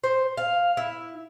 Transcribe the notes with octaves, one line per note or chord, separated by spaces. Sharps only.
C5
F5
E4